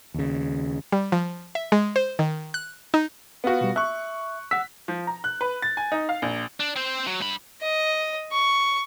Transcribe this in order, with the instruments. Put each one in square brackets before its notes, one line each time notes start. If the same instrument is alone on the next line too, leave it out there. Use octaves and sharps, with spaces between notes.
[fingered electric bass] D#2 C#3
[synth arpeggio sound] G3
F3
E5
G#3
C5
D#3
F#6
D#4
[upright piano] B3 F4 F#4
[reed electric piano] B2 G3
[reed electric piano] E5 [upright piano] C#6 F#6
[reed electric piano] F#5 E6 [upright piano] B6
[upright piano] F3
A#5
F#6
B4
A6
G#5
D#4
F5
A#1
[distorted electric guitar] D4
C4 C5
F#3
G2 B5
[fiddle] D#5
C#6